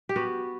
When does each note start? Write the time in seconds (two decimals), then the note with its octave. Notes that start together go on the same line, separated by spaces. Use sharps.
0.09 G4
0.16 B3 F#4